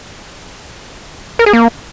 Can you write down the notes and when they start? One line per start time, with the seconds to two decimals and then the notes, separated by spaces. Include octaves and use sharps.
1.39 A#4
1.46 G#4
1.53 A#3